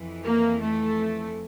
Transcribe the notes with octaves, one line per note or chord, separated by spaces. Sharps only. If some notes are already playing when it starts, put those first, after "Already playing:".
Already playing: F2 E3
A#3
A3